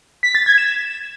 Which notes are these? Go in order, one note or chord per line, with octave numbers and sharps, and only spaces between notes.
B6
A6
G#6
E7